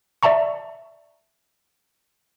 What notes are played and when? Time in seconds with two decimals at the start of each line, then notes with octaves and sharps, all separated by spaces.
0.23 D5 E5 A5 A#5 C#6